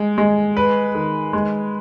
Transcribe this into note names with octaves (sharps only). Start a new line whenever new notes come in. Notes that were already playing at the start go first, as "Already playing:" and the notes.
Already playing: G#3
G#3
B4
D#3
G#3